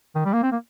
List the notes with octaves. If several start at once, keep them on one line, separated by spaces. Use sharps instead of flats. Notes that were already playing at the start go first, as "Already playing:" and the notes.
D#3
G3
A#3
C4
A#3